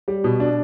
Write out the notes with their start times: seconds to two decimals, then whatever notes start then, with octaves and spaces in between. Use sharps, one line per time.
0.08 G3
0.24 B2
0.40 D4